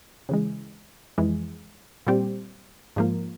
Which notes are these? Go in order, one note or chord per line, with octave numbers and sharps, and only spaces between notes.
C#3 E3 G#3
F2 E3 G#3
A#2 G3 C4 G4
G#2 F3 A#3